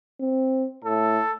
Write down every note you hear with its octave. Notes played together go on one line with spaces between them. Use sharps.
C4
A2 A4